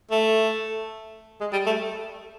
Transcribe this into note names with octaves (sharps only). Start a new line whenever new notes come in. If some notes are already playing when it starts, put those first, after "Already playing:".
A3
G#3
G3
A3